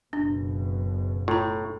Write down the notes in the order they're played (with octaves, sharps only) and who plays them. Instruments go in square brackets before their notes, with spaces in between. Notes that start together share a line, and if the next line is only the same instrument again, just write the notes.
[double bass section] F#1 B2 [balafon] D4
[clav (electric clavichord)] A2 [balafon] F4 A#5